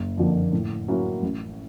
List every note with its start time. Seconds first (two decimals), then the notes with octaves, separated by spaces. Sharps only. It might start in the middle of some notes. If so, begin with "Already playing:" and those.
Already playing: F#1
0.17 F2 D3 F3 A#3
0.53 A2
0.88 F#3 A#3 C#4 E4
1.23 A1